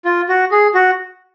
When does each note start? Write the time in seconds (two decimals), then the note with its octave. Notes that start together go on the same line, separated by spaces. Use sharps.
0.05 F4
0.29 F#4
0.51 G#4
0.74 F#4